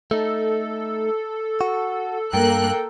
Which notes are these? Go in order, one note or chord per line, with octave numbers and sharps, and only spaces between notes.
A3 D#4 A4
F#4
G2 A#3 A#4 G5 F#6